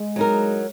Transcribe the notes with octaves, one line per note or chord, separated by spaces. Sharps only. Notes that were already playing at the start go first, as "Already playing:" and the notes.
Already playing: G#3
F#3 D#4 A#4